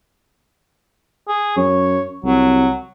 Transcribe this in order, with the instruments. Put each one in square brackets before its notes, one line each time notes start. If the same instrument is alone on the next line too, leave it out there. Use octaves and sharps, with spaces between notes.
[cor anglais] G#4
[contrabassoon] F#2 [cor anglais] C#5
[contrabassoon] C2 [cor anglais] F#3